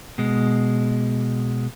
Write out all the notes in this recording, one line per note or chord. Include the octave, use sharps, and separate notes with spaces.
B2 G#3